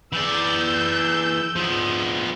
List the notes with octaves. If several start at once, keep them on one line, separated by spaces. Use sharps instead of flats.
E3 D5 E6 G6
F3 B3